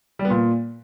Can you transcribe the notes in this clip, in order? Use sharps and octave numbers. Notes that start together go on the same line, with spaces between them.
G3
B3
A#2